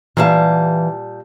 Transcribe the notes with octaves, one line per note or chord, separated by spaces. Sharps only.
A#2 E3 G3 F5 A5